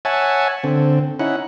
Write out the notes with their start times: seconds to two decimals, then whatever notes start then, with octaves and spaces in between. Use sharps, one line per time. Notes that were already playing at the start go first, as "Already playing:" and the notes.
0.05 C#5 E5 F#5 G#5 A5
0.64 D3 C4
1.20 C#4 D#4 E4 F#5